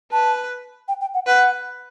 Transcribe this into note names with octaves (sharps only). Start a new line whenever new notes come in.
B4 A5
G5
G5
F#5
B4 F#5